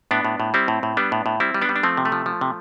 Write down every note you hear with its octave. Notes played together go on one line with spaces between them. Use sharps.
A2 B3 D4
A2
A2
G3 C4 E4
A2
A2
G3 B3 D4
A2
A2
G3 C4 E4
G3
B3 D4
G3
D4
F3 A3 C4
C3
A3
F3
F3
C3